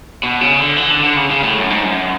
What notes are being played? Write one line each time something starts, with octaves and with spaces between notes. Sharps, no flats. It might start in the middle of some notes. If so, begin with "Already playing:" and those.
B2
C#3
D3
E3
D3
D3
C#3
C#3
A2
F#2
G#2
F#2